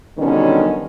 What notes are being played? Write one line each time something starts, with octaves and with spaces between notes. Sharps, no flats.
B2 D3 D#3 F#3 G3 C#4